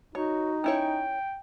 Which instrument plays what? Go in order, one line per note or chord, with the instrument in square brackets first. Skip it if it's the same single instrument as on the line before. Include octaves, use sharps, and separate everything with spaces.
[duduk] D#4 [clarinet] F#4 [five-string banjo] C#5
[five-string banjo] C#4 E4 C#5 [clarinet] G5